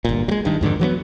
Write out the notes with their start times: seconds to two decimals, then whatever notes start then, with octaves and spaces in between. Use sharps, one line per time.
0.05 G1 A#2
0.28 F#3 G#3
0.45 G2 D#3
0.61 F2 G#2 D3 D#3
0.79 E3 F#3 G#3 B3